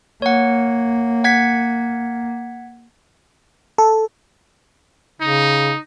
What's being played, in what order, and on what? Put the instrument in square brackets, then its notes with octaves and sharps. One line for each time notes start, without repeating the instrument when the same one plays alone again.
[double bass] A#3 [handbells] C#5 F#5
[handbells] F#5 G#6 B6
[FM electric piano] A4
[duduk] C#3 [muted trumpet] D#4